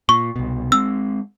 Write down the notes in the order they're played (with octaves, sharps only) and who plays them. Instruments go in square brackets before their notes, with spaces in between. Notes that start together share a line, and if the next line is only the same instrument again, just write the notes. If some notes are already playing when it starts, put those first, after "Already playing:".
[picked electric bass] A#2 [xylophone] C#6
[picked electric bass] C2 B2
[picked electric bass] G#3 C4 [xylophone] E6